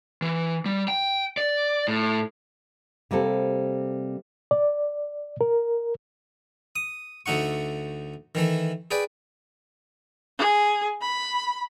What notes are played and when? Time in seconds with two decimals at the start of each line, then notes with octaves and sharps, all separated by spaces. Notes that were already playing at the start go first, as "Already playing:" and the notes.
0.22 E3
0.66 G3
0.88 G5
1.37 D5
1.88 A2
3.11 C3 G3 A#3 C4 A4
4.51 D5
5.41 A#4
6.76 D#6
7.26 D2 A3 D#4 F#5 C#6
8.35 D#3 E3 A3
8.91 G#4 B4 D5 G5
10.38 G#4
11.01 B5